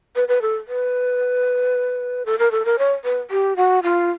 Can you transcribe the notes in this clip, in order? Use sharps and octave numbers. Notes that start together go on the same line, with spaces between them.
B4
B4
A4
B4
A4
A#4
A4
A#4
C#5
B4
G4
F#4
F4